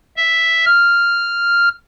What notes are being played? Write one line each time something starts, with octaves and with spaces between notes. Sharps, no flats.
E5
F6